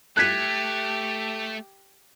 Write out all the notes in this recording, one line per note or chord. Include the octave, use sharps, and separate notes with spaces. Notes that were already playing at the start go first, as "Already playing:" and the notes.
A3 G4 F#6 G#6 B6